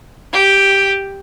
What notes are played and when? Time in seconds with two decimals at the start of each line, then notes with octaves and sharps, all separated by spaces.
0.33 G4